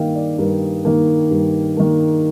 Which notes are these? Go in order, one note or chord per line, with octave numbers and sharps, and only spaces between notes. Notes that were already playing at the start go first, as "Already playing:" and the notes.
Already playing: G2 D#3 A#3 D#5 F5 G5
D5
G2 A#4
D#3 A#3
G2
D#3 A#3